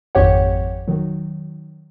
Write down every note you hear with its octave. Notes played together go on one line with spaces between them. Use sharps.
G#1 F2 G4 C#5 F#5
D#3 F#3